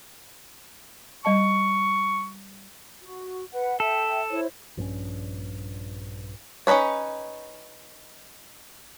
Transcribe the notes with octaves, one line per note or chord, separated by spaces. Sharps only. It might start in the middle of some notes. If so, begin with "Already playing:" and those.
G3 D#5 A5 C#6
F#4
B4 F#5
A4 E5 G5
E4 C5 C#5
A#1 G2 C4 C#4
C#4 D#4 E4 B4 C#5